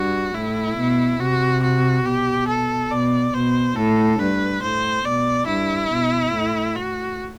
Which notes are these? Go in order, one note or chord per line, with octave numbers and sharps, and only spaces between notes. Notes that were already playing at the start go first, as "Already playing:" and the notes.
Already playing: G2 F#4
A2 E4
B2
C3 F#4
F#4
B2 G4
A4
B2 D5
B2 C5
A2 A4
G2 B4
A2 C5
B2 D5
G2 E4
B2
A2
F#4